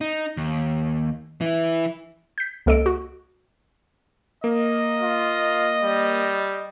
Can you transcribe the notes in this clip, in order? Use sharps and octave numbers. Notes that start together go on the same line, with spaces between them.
D#4
D#2
E3 E4
G6 B6
C#2 A#3 A4 D#5 D7
F#4
A#3 A#4 D#5
F4
G3